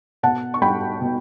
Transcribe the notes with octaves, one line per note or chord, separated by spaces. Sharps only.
B2 F#5 A5
C#6
G3 G5 B5
B2